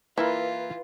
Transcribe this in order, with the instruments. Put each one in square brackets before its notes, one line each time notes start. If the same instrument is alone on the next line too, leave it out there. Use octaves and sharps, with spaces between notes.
[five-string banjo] E3 [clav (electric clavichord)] A#3 E4 A#4 [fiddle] F4 [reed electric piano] B4